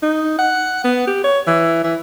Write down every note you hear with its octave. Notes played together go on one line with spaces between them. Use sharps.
D#4
F#5
B3
G4
C#5
E3
E3